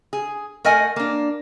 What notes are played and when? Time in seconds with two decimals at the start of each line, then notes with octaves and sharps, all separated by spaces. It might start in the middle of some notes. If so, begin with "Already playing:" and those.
0.13 G#4
0.65 A3 A#4 D#5 F#5 G#5
0.96 A#3 D4